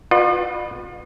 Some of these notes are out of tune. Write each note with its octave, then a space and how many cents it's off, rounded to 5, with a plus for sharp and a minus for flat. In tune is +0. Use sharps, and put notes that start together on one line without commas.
F4 +35 B4 +0 D#5 -45